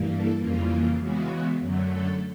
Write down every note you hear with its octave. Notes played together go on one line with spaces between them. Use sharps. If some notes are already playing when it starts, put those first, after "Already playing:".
Already playing: G2 E3 G3 A#3
A4
F2 C#3 E3 G3 A#3 F4
C#3 E3 G#3 B3 F#4
F#2 D3 F#3 A3
A4